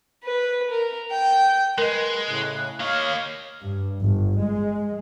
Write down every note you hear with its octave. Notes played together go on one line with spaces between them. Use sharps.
B4
A#4
G5
G#3 A#4 B4 D#5 C6
A2 C#3 F#6
A#3 C#5 D#5 F5 F6
G2
G1
G#3